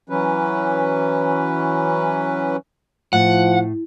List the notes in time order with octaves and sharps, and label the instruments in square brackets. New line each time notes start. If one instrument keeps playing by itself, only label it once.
[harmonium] E3 F#3 C#4 B4
[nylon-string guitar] A2 [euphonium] F3 [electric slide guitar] F#5